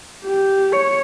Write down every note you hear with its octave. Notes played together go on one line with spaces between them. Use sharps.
G4
C#5